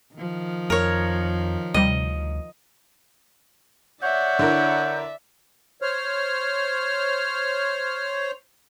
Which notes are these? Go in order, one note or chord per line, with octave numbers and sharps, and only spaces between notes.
D#3 F3
F2 A#4 C#5
D2 C3 G3 D#5
C#5 D5 E5 F#5 G6
D3 E4 A#4
C5 C#5 F6